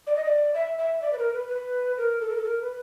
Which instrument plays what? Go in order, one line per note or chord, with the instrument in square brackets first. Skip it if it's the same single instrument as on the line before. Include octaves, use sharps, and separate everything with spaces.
[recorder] D5
D#5
D5
E5
E5
D5
B4
A#4
B4
B4
A#4
A4
A#4
A4
A#4
B4